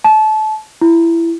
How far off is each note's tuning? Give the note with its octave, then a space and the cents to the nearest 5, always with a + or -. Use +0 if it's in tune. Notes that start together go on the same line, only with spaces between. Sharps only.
A5 -25
E4 +20